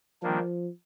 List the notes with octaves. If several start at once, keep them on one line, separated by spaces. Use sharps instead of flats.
D#3 F3 G3 A#3 D4